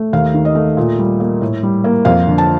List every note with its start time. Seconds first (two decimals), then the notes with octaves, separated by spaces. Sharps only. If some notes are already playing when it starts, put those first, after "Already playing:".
Already playing: A3
0.13 D#2 F5
0.34 D#3
0.45 D#5
0.55 A3
0.77 A#2
0.99 G3
1.20 A#3
1.41 A2
1.63 G3
1.84 A#3
2.05 F2 F5
2.27 D3
2.38 A5